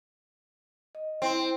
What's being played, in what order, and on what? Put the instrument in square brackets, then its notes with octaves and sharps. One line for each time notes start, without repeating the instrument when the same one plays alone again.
[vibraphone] D#5
[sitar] C4 [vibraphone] E4 C6